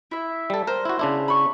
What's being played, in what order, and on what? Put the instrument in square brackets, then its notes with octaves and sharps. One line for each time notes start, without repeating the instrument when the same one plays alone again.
[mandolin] E4 E5
[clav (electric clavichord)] G3 A4
[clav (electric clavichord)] A#4 [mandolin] C5
[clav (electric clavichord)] E4 F#4
C#3 D4 E4
[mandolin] B5 C#6